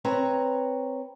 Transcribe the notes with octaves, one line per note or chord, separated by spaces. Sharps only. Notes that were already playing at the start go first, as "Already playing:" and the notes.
C4 B4 C#5 A#5